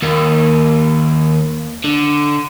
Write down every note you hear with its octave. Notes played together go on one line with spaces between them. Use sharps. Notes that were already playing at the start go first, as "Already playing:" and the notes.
D#2 A#3
D3